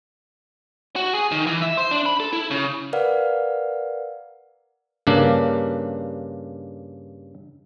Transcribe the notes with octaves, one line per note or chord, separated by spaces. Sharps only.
F#4
G#4
D#3
E3
E5
C5
D4
B5
A4
E4
C#3
A#4 B4 D5 F5 F#5 F6
G2 C#3 A#3 D4